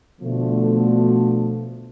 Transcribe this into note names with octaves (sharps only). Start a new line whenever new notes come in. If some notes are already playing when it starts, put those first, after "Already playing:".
B2 D3 F3 A3